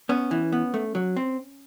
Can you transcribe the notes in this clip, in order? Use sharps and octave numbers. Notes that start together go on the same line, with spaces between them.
B3 C#4
E3
B3
A3
F#3
C4